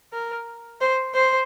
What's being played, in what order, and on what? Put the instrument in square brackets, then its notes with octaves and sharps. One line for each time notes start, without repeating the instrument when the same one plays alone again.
[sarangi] A#4
C5
C5